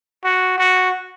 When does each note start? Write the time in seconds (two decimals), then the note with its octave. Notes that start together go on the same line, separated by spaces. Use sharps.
0.24 F#4
0.58 F#4